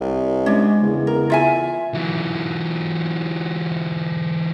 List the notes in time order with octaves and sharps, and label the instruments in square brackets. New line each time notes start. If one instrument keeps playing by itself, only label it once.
[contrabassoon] C2
[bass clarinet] G#3 [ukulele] C#4 D4
[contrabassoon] E2 [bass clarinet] C#3
[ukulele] A#4
F4 E5 G#5
[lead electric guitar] E3 F#3